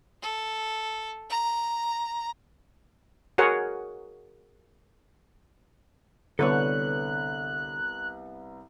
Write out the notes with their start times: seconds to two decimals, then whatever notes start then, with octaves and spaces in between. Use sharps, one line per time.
0.22 A4
1.30 A#5
3.38 F#4 G#4 A#4 C#5 F#5
6.39 C2 D3 B3 A4 B4 C#5 F#6